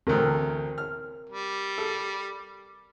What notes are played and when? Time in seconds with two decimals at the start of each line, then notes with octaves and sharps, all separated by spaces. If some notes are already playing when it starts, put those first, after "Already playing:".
0.07 A1 D2 C4 A#4
0.78 F6
1.30 G3
1.78 A4